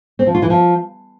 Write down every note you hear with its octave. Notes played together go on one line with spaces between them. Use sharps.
C4
F3
F4
E3
F3